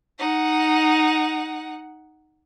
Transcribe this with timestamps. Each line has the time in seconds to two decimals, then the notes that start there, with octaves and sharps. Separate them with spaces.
0.19 D#4 F#5